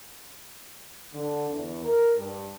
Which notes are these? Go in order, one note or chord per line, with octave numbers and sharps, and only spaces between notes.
D3
E2
A#4
G2